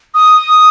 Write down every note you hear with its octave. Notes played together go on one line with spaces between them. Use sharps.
D#6